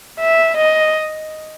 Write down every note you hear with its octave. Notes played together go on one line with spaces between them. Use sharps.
E5
D#5